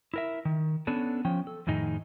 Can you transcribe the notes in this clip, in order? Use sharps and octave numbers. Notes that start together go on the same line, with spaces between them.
E4 A#4 E5
D#3
B3 C#4 D4 A4
F3 C#4 G5
A4
F2 A2 D#3 D#4 G#4